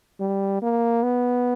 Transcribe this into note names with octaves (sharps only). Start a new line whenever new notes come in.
G3
A#3
B3